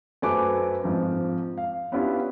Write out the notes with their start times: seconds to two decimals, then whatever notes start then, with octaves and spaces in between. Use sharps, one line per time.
0.22 F#2 A3 B4 C5 G#5 D6
0.83 G#2 F3 C4
1.58 F5
1.92 B3 C#4 D4 E4 F4 G4